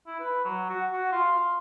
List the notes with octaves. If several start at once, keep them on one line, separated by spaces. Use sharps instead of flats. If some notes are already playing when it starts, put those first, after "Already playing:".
E4
B4
F#3
F#4
F#4
F4
F4